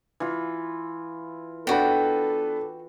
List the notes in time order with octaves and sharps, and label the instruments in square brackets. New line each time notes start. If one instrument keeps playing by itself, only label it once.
[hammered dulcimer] E3 F4
[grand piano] B3 D4 B4 [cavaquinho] F#4 G5 [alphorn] A4